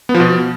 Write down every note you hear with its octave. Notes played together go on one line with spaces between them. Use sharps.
B3
F3
B2